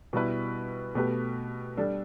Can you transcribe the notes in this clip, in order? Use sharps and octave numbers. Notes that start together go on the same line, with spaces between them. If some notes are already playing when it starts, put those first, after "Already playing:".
B2 G3 E4 B4
B2 A3 G4 B4
G3 D4 A4